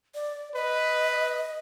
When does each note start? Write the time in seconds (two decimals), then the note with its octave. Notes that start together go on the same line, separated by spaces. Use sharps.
0.15 D5
0.55 B4 D#5